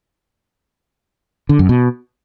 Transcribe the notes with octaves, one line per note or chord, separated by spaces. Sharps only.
D3
F#2
B2